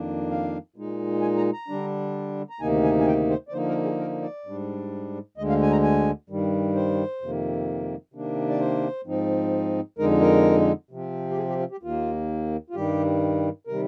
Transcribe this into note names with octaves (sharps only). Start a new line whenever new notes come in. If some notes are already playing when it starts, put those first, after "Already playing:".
Already playing: F2 D#3 A#3 D4
F5
A#2 G#3 D#4
G#5
A#5
A#5
D3 G3 D4
A#5
D2 C3 D#3 A#3 D#4 G#5
G#5
G#5
G5
C5
D5
D3 F3 A#3 D#4 C5
A#4
G#4
A#4
D5
G#2 G3 D4
D2 D3 G#3 D#5
F5
G#5
A#5
G#5
G2 D#3 G3
C5
F2 C3 D#3 A#3
C3 D#3 A#3 D4
D5
C5
G#2 F3 C4 D#4
F2 D3 G#3 D#4 A#4
A#4
C3 F3 C4
G4
G#4
G4
F4
G4
D#2 D#3 A#3 F4
F4
G2 D#3 G3 G4
C3 D#3 G3 A#4